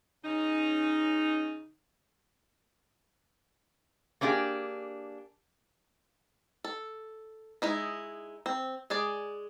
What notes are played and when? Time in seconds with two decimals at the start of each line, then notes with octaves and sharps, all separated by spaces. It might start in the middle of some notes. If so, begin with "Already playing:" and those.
0.25 C#3 C#4 D#4
4.21 A#3 C#4 D4 E4 G4 G#4
6.64 A4
7.62 G#3 D#4 E4
8.46 C4
8.90 G#3 G#4 D5